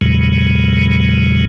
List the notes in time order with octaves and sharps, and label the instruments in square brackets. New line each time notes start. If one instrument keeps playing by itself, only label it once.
[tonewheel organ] E2 A#2 C#3 F#3 G#3